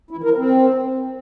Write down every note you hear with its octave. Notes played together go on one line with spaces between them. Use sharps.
E4
E3
A#4
F3
C4